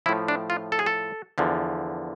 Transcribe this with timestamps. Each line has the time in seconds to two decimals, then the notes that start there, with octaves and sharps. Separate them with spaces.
0.06 F3 E4
0.09 A2
0.28 D4
0.50 F4
0.72 A4
0.79 G#4
0.86 A4
1.38 E2 D3 F3